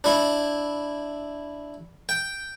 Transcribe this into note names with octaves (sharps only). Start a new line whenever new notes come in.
D4 E4
G5